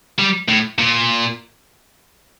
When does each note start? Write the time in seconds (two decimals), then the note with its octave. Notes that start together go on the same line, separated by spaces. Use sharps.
0.19 G3
0.49 A2
0.79 A#2